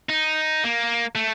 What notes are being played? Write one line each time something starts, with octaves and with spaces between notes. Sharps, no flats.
D#4
A#3
A3